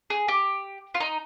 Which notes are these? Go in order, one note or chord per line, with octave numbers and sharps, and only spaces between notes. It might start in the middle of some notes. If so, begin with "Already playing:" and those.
G#4
G4
F4
D#4